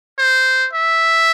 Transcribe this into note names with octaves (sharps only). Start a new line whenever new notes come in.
C5
E5